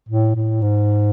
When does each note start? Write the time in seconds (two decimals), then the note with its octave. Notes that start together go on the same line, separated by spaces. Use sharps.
0.09 A2
0.35 A2
0.62 G#2